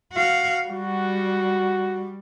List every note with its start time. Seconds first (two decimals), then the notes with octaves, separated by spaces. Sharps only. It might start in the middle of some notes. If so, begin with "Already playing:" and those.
0.13 F#4 F5
0.68 G3 F#4